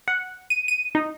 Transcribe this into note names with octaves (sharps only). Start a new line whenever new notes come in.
F#5
D#7
D#7
D#4